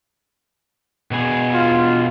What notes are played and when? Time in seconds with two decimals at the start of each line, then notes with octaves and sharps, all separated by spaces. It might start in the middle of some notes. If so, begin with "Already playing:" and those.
1.11 B2 G#4
1.53 F4